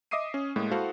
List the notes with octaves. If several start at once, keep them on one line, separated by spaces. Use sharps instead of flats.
D#5 E5 D6 D#6 C7 D#7
C#4
A2 G#3 A#3
E4 F#4 A4 C5 F5 F#5